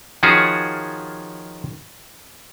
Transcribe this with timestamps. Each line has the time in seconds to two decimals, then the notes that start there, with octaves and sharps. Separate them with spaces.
0.23 D#3 F3 C#4 F4 F#4 G#4